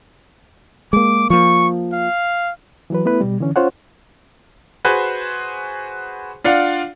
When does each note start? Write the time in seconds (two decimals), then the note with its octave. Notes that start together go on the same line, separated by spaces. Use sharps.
0.93 G#3 A#3 D6
1.30 F3 A#3 C#6
1.93 F5
2.90 E3 F#3 B4
3.05 A3 B3 E4 B4
3.21 B2 G3
3.40 D3 E3 C#4
3.56 C#4 F4 C5 C#5 F#5
4.85 F#4 G#4 B4 C5
6.44 D4 F4 D5 F5 F#5